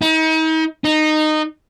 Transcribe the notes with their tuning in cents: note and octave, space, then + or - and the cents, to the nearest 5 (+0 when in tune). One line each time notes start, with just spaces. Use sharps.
D#4 +40
D#4 -15